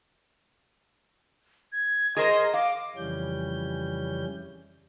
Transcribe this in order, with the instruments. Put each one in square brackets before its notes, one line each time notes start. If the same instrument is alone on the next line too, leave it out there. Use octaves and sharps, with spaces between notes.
[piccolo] G#6
[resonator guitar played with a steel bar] G#4 A#4 C5 [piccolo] D#5
[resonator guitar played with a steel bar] F5 [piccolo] D6
[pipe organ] F2 C#3 E3 G3 C#4 G6